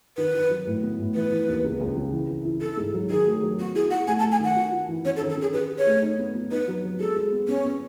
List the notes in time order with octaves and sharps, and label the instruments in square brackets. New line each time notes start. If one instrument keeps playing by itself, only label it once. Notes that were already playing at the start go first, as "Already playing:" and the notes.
[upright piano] D#3 [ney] B4
[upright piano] D#3
F#3
A2
B3
A2
[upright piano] E3 [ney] B4
[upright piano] E3
D#2
C#2
C#2
C#3
E3
E3
E4
[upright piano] E4 [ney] A4
[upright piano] G#2
F#3
[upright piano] D#3 [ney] G#4
[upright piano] A3
F#3
[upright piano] B3 [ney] F#4
[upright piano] E4 [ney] G#4
[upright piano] E4 [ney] F#5
[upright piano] A3 [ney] G#5
[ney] A5
[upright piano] A3
[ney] G#5
[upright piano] D#3 [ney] F#5
[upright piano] F#4
F#4
E3
[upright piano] C#4 [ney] C#5
[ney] A4
[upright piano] D#3
[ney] A4
[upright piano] C#4 [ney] G#4
[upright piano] G#4 [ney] B4
[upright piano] G#4
[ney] C#5
[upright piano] A3
D#4
B3
B3
[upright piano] D#4 [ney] B4
[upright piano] F#3
F#3
[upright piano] G#3 [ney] A4
[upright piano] G#3
B3
[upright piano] B3 [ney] C#4
[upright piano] B3